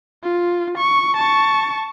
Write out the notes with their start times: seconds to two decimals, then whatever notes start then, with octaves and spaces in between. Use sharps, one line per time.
0.24 F4
0.78 C#6
1.17 A5 C#6